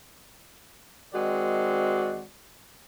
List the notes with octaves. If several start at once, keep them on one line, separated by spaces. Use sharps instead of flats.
D#3 G#3 C4 F#4 D5